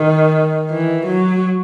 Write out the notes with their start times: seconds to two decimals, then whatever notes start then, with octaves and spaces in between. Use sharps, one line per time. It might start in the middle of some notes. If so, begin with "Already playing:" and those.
Already playing: D#3
0.71 E3
1.06 F#3